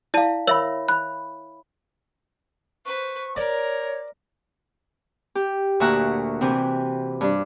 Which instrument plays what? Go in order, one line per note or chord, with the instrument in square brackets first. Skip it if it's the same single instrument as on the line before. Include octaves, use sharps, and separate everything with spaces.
[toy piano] E4 F5 [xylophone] D5 A5
[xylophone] A#4 E6 F#7 [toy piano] C#5 E5 B5
[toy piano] B5 [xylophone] F#6
[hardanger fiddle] B4 C5 [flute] C#6
[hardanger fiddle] A#4 [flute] C#5 [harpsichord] D5
[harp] G4
D2 A#2 F#4 E5 A#5 F#6
C3 E3 C4
G2 D4